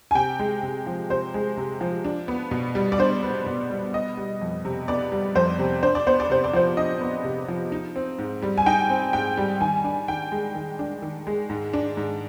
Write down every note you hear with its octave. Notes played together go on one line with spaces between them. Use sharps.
G#5
C3 G5
G#3
C3
F3
C3 C5
G#3
C3
F3
D4
B3
B2
G3
D5
D4 C5
B3
B2
G3
B3 D#5
G3
F2
C3
B3 D5
G3
F2 C5
C3
D4 C5
D5
B3 C5
D5
C3 C5
D5
F3 C5
D4 D#5
B3
C3
F3
D#4
C4
G#2
G3
G#5
D#4 G5
C4
G#2 G5
G3
D#3 G#5
D4
D#3 G5
G#3
D#3
D4
D#3
G#3
G#2
D4
G#2